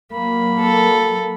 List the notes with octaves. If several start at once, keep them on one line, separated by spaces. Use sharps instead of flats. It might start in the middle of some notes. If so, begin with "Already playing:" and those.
F#3 A#3 B5
A4